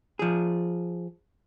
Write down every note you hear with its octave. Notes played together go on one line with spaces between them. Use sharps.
F3 G#4